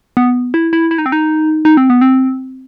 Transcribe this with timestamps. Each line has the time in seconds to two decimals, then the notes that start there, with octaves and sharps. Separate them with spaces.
0.17 B3
0.54 E4
0.73 E4
0.91 E4
0.98 D#4
1.06 C4
1.12 D#4
1.65 D#4
1.77 C4
1.90 B3
2.01 C4